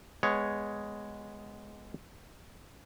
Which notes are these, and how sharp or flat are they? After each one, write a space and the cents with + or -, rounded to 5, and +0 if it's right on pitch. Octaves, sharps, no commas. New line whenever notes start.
G#3 +0 B3 +15 C#5 +0